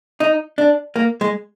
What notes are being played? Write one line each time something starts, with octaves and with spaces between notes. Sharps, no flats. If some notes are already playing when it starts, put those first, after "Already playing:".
D#4
D4
A#3
G#3